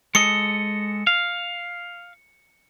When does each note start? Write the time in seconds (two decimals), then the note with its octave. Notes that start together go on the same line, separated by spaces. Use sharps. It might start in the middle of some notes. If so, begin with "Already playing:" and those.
0.15 G#3 A4 D#5 C#7
1.07 F5